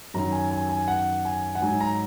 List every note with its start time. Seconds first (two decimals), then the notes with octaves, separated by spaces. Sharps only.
0.14 F#2 D#3 F#3 A#5
0.32 G#5
0.51 G#5
0.69 G#5
0.88 F#5
1.25 G#5
1.55 F#5
1.61 G#2 F#3 D#4 G#5
1.81 A#5